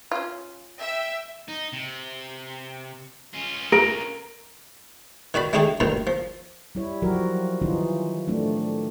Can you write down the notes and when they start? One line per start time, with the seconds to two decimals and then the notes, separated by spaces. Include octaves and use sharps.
0.12 C#4 F4
0.79 E5 G5
1.49 D#4
1.73 C3
3.34 C#4 F4
3.72 A#4 D7
5.34 D#3 F#4 D5 B5
5.53 G#3 A3 D4 D#4 G4 G#4
5.80 D2 G2 A#2 D3 D#3
6.07 F3
6.75 G3 E4 C#5
7.02 F3 F#3 F#4 G4 A#4
7.62 D#3 E3 C#4 D#4 F4
8.28 A3 C4 D4